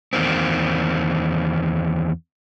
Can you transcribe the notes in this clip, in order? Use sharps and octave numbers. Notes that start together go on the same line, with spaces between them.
E2 D#3 A#3 C4